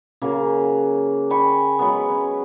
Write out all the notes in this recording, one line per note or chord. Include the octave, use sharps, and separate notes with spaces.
C#3 F#3 A#3
G5 G#5 B5 C#6
F#3 G#3 B3
C#4